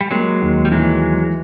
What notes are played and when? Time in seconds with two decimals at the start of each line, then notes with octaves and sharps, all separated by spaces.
0.01 G3
0.11 F#3 G#3 A#3
0.41 D#2
0.65 G3
0.72 E3 F#3 G#3